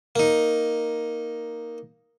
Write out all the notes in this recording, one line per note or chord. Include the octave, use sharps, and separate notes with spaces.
A#3 D#4